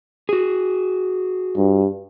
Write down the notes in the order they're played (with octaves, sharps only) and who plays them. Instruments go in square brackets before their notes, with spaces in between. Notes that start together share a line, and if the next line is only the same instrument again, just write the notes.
[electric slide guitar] F#4 G#4
[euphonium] G2